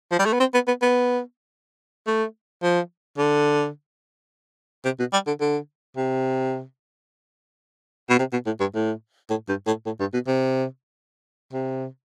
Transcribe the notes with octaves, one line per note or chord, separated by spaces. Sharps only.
F3
G3
A3
B3
C4
B3
B3
B3
A3
F3
D3
C3
B2
G3
D3
D3
C3
B2
C3
B2
A2
G2
A2
A2
G2
A2
A2
G2
B2
C3
C3